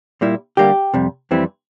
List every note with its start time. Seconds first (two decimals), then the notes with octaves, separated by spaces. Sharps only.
0.21 A#2 G3 A#3 E4
0.57 D3 G3 A#3 G4
0.94 F2 C3 G3
1.31 F2 E3 G3 C4 E4